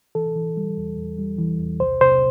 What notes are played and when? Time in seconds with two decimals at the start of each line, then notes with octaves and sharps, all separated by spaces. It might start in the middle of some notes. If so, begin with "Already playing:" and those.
0.15 E3 A4
0.36 E3
0.57 G3
0.78 E2
0.98 E2
1.18 G3
1.39 E3
1.60 E2
1.80 C2 C5
2.01 C3 C5